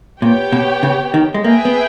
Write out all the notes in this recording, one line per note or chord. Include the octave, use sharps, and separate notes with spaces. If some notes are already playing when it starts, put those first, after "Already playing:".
A#2 B3 G4 C#5 G5
B2
C#3
D#3
G#3
A#3 G#4 B4 E5 G5
B3